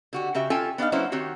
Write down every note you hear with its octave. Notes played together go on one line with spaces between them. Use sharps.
D3 F#4 G4
C#3 F#4 G4 E5
C#4 F4 A4 G5 G#5
B3 D4 D#4 F5
F#3 A#3 B3 C#4 E4 C5
D#3 C4 F#4 G4 C#5